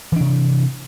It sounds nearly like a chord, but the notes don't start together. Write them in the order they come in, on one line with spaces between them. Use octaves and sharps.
E3 D4 C3